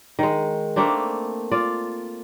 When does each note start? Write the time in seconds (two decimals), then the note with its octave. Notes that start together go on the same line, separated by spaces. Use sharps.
0.19 D#3 G#3
0.76 A3 A#3 C4 D4
1.52 F4 D5